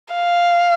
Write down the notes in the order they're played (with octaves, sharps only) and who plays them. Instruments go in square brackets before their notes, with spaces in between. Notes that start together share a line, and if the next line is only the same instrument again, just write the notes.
[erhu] F5